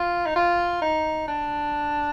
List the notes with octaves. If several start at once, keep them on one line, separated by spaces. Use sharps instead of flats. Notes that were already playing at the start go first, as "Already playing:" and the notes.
Already playing: F4
D#4
F4
D#4
D4